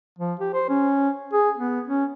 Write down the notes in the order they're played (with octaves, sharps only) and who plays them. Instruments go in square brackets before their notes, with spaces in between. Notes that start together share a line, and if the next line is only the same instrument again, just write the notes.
[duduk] F3
G4
C5
C#4
G#4
B3
C#4